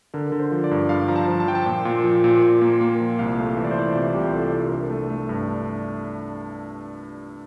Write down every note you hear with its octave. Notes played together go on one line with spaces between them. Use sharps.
D3 A#4
D3
C5
F3
D5
G2
G2 F5
F3 A#5
A5
F3
A5
F3 G5
A5
A#2 G5
A#2
F3
A#2
A#2
A#3
A#3
F3
C2 F5
A3
E3 E5
D5
C5
E3 D5
C3 F4
C2 G4
C2 A4
C2 G4
A#4
D4 A4
A3
A3
G2
D4